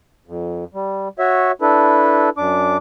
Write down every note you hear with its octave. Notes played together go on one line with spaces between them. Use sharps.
F2
G3
F#4 C#5 E5
D4 E4 A4 B4
F#2 D4 D6